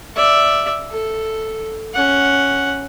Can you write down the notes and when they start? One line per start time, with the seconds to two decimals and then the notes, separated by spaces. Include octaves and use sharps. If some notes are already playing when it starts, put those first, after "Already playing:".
0.16 D5 E5
0.91 A4
1.94 C#4 F#5